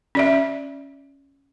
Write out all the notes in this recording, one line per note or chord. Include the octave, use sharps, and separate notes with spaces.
C#4 D5 E5